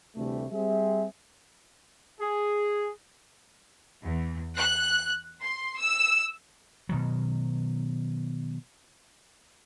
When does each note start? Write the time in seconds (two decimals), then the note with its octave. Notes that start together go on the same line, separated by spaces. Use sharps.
0.16 D2 C3 E3 G3 A3
0.51 G3 C4 G#4 E5
2.20 G#4
4.03 E2
4.57 F#6
5.42 C6
5.78 E6
6.89 B2 D#3 F#3